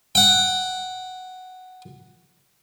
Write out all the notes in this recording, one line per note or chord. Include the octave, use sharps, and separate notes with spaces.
F#5 G5